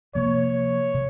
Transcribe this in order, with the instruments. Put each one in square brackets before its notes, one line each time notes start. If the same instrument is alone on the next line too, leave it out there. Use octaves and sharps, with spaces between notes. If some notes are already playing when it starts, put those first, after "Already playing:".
[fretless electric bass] C3 F3 A#3 [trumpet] C#5
[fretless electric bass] C3